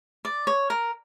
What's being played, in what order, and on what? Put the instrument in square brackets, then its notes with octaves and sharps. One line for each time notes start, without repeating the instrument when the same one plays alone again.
[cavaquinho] D5
C#5
A#4